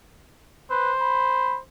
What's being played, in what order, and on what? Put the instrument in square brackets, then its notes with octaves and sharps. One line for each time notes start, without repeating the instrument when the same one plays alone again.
[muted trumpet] B4 [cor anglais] C5
[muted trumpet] B5